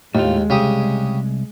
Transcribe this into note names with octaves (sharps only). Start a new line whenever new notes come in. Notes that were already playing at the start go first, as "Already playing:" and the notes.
D#2 A2 G#3 A3 F4
C2 C#3 G4 D#6